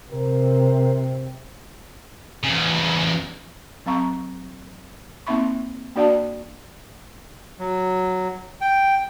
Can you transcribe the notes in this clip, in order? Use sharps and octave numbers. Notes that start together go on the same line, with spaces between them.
C3 A#4
E2 C#3
F#3 C4 F5 A#5 C#6
A#3 C4 D#4 E5 B5 C#6
A#3 D4 F#4 D5 F5 A5
F#3
G5